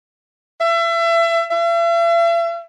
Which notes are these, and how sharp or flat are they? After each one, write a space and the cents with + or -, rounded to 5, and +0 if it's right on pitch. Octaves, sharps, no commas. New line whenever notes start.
E5 +30
E5 +45